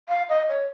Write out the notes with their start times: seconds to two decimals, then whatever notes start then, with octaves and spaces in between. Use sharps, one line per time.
0.09 F5
0.29 D#5
0.49 C#5